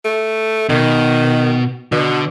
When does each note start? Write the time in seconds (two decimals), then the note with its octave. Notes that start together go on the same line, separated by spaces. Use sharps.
0.05 A3
0.69 B2 D#3
1.92 B2 D3